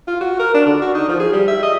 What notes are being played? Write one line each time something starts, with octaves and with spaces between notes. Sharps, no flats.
F4
F#4
A#4
D4
D3
F#4
D#4
F3
G#4
G3
E5
D#5